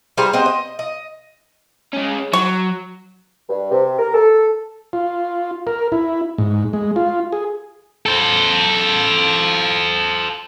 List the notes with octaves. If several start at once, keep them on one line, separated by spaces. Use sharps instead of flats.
G3 G#4 C5 A#5
C4 C5 D#5 F#5
D#5
D#5
G#3 C#4
F#3 C#6
G2
C3
A#4
A4
F4
A#4
E4
G#2
G#3
F4
G#4
A4 C5